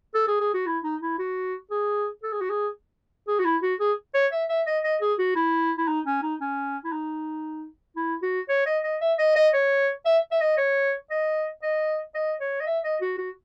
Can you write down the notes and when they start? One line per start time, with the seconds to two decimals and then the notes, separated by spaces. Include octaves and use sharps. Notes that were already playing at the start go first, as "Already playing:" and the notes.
0.15 A4
0.28 G#4
0.41 G#4
0.54 F#4
0.66 E4
0.84 D#4
1.02 E4
1.19 F#4
1.71 G#4
2.23 A4
2.32 G#4
2.41 F#4
2.50 G#4
3.28 G#4
3.39 F#4
3.45 E4
3.63 F#4
3.80 G#4
4.14 C#5
4.32 E5
4.49 E5
4.67 D#5
4.84 D#5
5.01 G#4
5.19 F#4
5.36 E4
5.78 E4
5.88 D#4
6.06 C#4
6.23 D#4
6.41 C#4
6.85 E4
6.92 D#4
7.97 E4
8.23 F#4
8.49 C#5
8.66 D#5
8.84 D#5
9.01 E5
9.19 D#5
9.36 D#5
9.54 C#5
10.05 E5
10.32 E5
10.40 D#5
10.57 C#5
11.10 D#5
11.63 D#5
12.15 D#5
12.40 C#5
12.60 D#5
12.67 E5
12.84 D#5
13.01 F#4
13.18 F#4